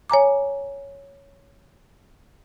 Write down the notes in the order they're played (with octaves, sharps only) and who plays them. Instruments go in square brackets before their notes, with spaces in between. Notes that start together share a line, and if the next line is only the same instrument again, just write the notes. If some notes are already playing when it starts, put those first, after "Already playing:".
[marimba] C#5 G#5 A#5 D6